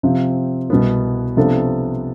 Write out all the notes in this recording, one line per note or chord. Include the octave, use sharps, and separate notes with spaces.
C3 F3 C4
C2 B2 B3
C3 F3 B3 D4 A4